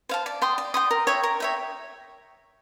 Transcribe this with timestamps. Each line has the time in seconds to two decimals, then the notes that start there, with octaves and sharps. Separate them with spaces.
0.09 C5 F5 A5
0.26 D5
0.42 G5 C6 D#6
0.58 D5
0.74 G5 C6 D#6
0.91 A#4
1.07 C#5 E5 G5
1.24 A#4
1.40 C#5 E5 G5